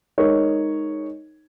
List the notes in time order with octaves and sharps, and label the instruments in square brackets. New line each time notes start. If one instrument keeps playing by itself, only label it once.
[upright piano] G#3 D#4 A#4 C#5